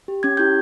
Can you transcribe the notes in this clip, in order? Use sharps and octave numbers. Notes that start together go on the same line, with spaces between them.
G4
C#4 G#6
E4 G4 G6